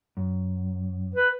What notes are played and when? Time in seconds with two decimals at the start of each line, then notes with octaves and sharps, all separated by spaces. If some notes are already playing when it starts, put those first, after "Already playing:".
0.17 F#2
1.15 B4